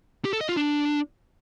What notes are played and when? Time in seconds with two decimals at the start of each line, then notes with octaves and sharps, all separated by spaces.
0.25 G4
0.33 A4
0.41 D#5
0.49 F4
0.57 D4